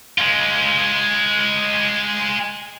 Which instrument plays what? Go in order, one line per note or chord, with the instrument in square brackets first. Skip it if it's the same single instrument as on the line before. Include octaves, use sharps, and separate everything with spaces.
[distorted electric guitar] G#3 F4